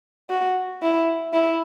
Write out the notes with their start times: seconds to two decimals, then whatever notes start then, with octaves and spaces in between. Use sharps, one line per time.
0.30 F#4
0.83 E4
1.33 E4